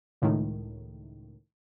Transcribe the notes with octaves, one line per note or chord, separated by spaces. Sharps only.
C#2 A2 D#3